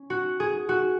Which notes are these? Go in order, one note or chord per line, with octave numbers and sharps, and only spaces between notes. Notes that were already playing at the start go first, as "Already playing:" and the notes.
Already playing: C#4
F#4
G#4
F#4